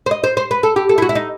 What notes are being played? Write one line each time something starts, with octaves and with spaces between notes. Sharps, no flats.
C5
D#5
C5
C5
B4
A4
G4
A4
E4
F#4
E4
D#4